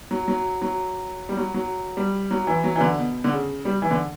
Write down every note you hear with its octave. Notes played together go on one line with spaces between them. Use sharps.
F#3
F#3
F#3
G3
F#3
F#3
G3
F#3
E3
F#3
E3
D3
B2
D3
C#3
G3
E3
D3